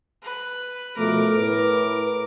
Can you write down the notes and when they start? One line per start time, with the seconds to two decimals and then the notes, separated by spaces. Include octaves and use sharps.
0.22 B4
0.97 B2 F3 A3 A#4 D6
1.35 A2 B4